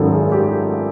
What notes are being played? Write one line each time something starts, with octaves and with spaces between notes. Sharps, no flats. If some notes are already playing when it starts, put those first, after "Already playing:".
Already playing: G#1 F#2 D#3 F#3 F4 A4
G#4
G4